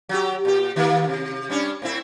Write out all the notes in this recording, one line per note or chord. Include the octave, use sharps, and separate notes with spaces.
F#3 G4
A#2 G4
D#3 A#3
C3
G3 C#4 D4
A2 C4 E4